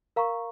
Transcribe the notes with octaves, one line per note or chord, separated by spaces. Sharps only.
A#4 F5 A#5 C#6